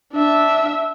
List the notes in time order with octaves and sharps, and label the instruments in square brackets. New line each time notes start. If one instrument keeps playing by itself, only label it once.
[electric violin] D4 E5